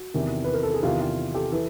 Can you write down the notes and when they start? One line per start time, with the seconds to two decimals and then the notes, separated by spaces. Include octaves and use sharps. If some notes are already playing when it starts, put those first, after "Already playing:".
Already playing: F#4
0.14 E2 C3 D#3
0.44 B4
0.53 A#4
0.63 A4
0.74 G#4
0.83 E2 C3 D#3 F4 G4
1.01 F4 G4
1.35 G4 A4
1.52 E3 A4 B4